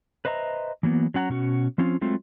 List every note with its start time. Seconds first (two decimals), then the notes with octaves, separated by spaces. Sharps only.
0.25 B4 C5 D#5 E5 A#5
0.83 E3 F#3 A#3 B3
1.14 F#3 C#4 F#5 A5 A#5
1.29 B2 C#4 F#4
1.78 F3 C4 C#4 F4
2.01 F#3 G#3 A3 C4 F4